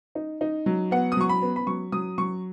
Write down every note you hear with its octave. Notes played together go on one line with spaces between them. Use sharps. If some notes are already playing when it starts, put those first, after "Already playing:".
D#4
D#4
F#3
B3 F#5
D#6
F#3 C#6
B5
B3
B5
F#3 C#6
F#3 D#6
F#3 C#6